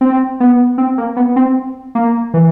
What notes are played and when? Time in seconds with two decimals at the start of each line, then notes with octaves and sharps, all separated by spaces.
0.01 C4
0.40 B3
0.78 C4
0.98 A#3
1.17 B3
1.36 C4
1.95 A#3
2.34 E3